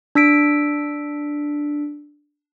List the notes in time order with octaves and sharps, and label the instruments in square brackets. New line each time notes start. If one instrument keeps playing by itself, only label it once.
[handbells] D4 E6 B6 D7